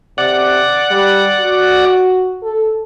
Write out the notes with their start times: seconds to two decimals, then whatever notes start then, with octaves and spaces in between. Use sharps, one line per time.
0.18 C3 D5 F#5
0.91 G3
1.40 F#4
2.43 A4